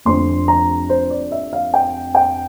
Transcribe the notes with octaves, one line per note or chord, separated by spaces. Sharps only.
F1 F2 D3 F3 C4 C6
A#5
C5
D5
E5
F5
G5
G5